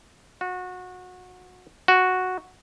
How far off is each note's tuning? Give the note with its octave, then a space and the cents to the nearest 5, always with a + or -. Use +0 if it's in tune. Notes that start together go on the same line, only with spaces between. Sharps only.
F#4 -25
F#4 -5